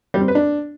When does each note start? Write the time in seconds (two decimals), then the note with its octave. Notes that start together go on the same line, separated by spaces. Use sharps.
0.14 G3
0.21 C4
0.28 B4
0.35 D4